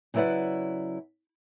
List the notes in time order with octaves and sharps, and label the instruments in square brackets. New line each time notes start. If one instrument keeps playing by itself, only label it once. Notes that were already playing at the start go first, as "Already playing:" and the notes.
[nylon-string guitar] C#3 F#3 E4 B4 D5 F#5